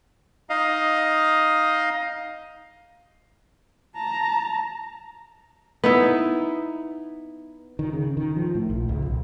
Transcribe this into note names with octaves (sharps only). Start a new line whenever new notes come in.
D#4 D#5 F5
A5 A#5
B3 D#4 E4
D#3
C#3
D#3
F3
A2
A#1
C#2
B1